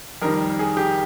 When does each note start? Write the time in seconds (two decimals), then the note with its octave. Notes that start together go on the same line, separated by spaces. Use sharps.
0.22 F2 D#3 G3 A#4
0.59 G#4
0.77 G4